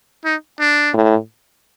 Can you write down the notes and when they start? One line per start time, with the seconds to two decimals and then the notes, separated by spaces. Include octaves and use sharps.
0.25 D#4
0.60 D4
0.94 A2